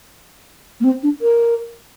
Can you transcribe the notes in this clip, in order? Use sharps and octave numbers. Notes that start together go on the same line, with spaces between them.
A#3
C4
D4
A#4